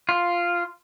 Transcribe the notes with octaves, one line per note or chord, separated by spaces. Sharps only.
F4